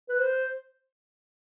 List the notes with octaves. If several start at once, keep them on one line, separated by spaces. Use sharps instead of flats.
B4
C5